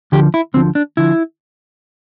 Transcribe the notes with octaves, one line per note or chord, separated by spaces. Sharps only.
D2 D3 F3 G4
E4
D2 D3 F3 C4
D4
D3 F3 E4